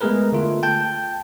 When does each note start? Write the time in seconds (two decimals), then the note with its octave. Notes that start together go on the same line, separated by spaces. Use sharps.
0.01 G#3 A3 B3 G#4 A#4 B4
0.32 D3 A3 F4
0.63 G5 A5 G6